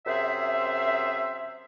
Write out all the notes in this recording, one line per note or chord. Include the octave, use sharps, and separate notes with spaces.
F#2 C3 G#4 C5 E5